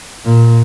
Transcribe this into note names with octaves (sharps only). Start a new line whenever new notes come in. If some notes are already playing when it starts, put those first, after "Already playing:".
A#2